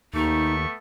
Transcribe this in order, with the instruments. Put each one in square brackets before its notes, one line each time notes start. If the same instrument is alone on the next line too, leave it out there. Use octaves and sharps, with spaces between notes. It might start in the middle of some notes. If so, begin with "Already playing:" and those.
[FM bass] D#2 [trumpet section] A3 B3 C#6 [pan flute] D#4